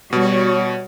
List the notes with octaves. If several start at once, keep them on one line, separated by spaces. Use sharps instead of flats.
B2 G3 F#4 C#5